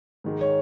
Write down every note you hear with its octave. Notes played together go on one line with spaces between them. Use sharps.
G#2 D#3 G#3
C#5